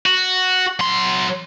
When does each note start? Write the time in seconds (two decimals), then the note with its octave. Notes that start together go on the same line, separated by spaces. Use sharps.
0.06 F#4
0.80 F#3 C6